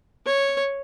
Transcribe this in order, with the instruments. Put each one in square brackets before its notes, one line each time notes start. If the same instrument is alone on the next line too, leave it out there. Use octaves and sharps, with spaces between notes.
[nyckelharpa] C#5